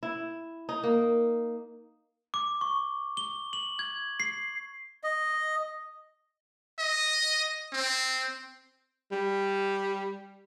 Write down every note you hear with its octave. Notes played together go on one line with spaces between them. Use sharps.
E4
D#4
A#3
D6
C#6
G7
F#7
G#6
C7
D#5
D#5
C4
G3